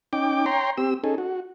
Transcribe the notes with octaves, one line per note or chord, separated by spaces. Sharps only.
C#4 D#4 G5 D6
C#5 G5 A#5 C6
C4 G4 E6
C#4 D#4 G#4 A4
F#4